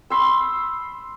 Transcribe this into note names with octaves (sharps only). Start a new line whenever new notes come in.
B5 C6 E6